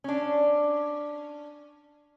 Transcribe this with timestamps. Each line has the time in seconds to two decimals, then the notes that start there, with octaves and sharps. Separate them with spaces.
0.04 C#4 D4